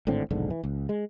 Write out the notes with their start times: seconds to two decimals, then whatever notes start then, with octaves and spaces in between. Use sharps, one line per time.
0.07 G#1 A2 D3 C4
0.31 F1 B1 G#2 D3
0.50 E3
0.64 C#2
0.89 G#3